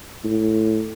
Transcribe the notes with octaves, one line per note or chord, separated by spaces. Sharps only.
A2